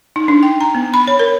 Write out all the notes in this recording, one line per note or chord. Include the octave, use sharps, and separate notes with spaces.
D#4
D4
G5
A#5
B3
B5
C#5
A#4